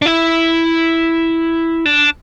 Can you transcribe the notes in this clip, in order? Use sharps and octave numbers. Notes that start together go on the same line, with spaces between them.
D4
E4
D4